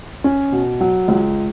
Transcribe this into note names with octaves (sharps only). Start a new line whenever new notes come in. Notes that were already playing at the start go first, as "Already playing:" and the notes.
C#4
B2
F#3
C#2